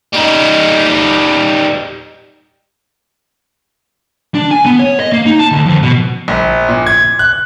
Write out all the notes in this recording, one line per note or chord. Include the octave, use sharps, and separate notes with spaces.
G3 D#4
D4
G#5
B3
C#5
D#5
A#3
D#4
A5
D2
F2
B2
A#1
A#2
G#6
F#6